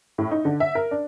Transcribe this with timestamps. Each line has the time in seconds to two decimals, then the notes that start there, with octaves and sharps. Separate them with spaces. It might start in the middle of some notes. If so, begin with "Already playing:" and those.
0.18 A2
0.31 D#4
0.45 D3
0.60 E5
0.75 A#4
0.91 D4